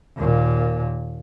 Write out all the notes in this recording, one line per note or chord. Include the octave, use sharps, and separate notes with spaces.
D#2 A#2